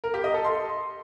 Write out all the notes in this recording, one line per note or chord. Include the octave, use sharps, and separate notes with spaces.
A#4
G4
D#5
A4
C6